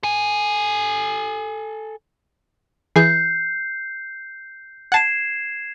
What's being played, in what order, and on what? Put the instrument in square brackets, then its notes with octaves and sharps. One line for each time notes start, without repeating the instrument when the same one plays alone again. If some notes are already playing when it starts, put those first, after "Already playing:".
[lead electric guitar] A4 G#5
[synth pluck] E3 G#4 G#5 [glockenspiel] G6 C7
[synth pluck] F#5 A5 [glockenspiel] G#6 C7 E7